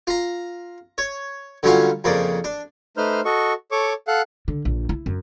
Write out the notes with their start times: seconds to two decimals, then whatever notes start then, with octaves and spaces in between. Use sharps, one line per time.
0.07 F4 A#5
0.98 C#5
1.63 D3 F#3 G3 C#4 F4
2.04 F2 C#3 A#3 D5
2.44 D4
2.97 A3 D#4 B4 C5 C6 F6
3.25 F#4 A4 D#5 C#6
3.71 A4 C#5 C#6 D6
4.08 A4 F5 F#5 F#6
4.48 D3
4.65 A#1
4.89 E4
5.06 F#2